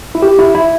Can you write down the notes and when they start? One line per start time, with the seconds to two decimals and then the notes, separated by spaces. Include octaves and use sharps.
0.15 E4
0.22 G4
0.39 E4
0.55 E4